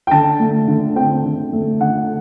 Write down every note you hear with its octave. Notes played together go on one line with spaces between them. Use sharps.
G5
D3 A5
A3
D3
C4 G5
D3
A3
D3 F#5